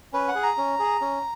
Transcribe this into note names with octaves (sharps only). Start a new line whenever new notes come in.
C#4 B4
F#5
G#4
A#5
C#4
G#4
C#4